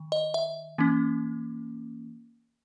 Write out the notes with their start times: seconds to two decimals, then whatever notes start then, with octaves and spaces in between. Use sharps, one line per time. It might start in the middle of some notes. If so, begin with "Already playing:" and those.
Already playing: D#3
0.12 D#5
0.34 E5
0.78 E3 A#3 C#4